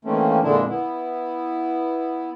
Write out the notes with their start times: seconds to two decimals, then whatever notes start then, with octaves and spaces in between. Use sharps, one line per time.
0.05 D#3 E3 A3 A#3 C4 C#4
0.43 F2 A#2 D3 G#3 D4 E4
0.68 B3 E4